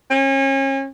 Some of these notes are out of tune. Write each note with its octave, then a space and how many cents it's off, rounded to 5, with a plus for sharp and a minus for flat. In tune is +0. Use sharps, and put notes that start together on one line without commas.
C#4 -35